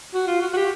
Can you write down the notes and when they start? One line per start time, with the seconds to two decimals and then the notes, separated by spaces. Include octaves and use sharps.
0.14 F#4
0.27 F4
0.41 F#4
0.53 F#4
0.57 G4